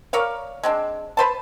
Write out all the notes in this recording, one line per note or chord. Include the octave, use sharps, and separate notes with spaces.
A#4 C#5 D5 F5
G#3 C4 D4
B4 C5 A5